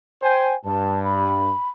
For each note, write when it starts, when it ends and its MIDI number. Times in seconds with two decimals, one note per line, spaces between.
0.22 0.55 72
0.22 0.55 79
0.22 0.55 80
0.65 1.51 43
0.65 1.02 81
1.04 1.68 83